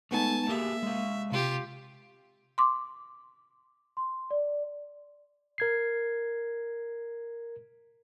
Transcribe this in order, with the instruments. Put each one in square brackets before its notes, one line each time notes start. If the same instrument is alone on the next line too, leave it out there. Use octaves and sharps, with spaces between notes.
[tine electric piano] G#3 B3 D#4 [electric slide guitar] A3 [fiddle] G#5 A5
[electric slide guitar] A3 G4 G#4 [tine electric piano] A#3 [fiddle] E5
[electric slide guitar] G#3 F5
[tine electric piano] C3 [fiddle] F4 G4
[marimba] C6 D6
[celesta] C6
D5
[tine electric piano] A#4 G#6 C7